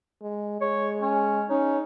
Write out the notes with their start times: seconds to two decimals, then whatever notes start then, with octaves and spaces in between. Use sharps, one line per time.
0.22 G#3
0.61 G#3 C#5
1.02 C#4
1.50 C#4 D#4